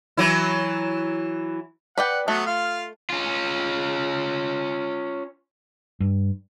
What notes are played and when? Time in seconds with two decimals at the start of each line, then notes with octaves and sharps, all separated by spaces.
0.17 E3 F#3 E4
1.98 B4 D5 F#5 G5
2.28 F#3 A3 B3
2.46 F4 F5
3.10 C#4 F4
6.00 G2